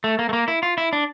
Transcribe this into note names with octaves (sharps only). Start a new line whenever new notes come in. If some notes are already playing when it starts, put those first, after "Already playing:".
A3
A#3
A3
A#3
E4
F4
E4
D4